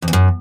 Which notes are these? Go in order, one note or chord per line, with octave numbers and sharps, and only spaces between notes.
F2
E2
F#2